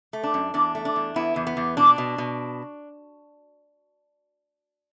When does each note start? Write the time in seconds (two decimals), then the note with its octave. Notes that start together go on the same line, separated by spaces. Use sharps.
0.13 A3
0.23 D4
0.34 F#2
0.54 E2 D4
0.75 A3
0.85 D4
0.96 E2
1.16 E2 B3 E4
1.36 E2
1.47 B3
1.57 E2
1.77 B2 D4
1.98 B2
2.18 B2